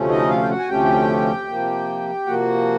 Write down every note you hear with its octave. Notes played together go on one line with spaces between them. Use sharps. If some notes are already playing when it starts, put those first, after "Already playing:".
Already playing: D2 C3 F3 A3 C#4
D#4 D#5
F4 F5
G5
F#4 F#5
G#5
D2 C3 F3 A3 C#4 G4 G5
C3 F3 A#3
C3 F3 A#3 F#4 F#5